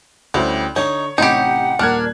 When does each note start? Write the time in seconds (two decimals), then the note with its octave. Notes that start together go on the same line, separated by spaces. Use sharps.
0.34 D2 G3 C#4 E4 C5
0.76 D3 D#4 C#5 C#6
1.18 A1 C3 D#4 G4 F#5 B5
1.79 D#1 A#3 D4 A#4 F6 F#6 G#6